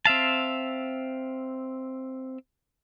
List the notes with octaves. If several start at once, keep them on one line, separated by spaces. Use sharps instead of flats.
C4 E5 F5 A5